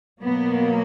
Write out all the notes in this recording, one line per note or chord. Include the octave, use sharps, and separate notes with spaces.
B2 F#3 A#3 B3